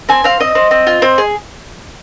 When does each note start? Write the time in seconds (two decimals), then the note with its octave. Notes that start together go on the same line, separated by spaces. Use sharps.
0.09 C4 G#5
0.24 C4 F5
0.40 C4 D#5
0.55 C4
0.71 C4
0.87 F4
1.02 C4
1.18 G#4